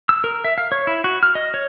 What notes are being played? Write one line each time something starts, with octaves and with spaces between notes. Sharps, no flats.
E6
A#4
E5
F5
C#5
E4
F#4
F6
D#5
C#5